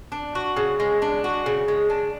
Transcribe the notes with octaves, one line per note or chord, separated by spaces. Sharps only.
D4
F#4
C#3
G#3
D4
F#4
C#3
G#3
D4